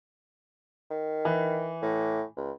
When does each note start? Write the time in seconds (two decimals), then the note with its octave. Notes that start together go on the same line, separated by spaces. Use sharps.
0.90 D#3
1.25 E3
1.82 A2
2.37 C#2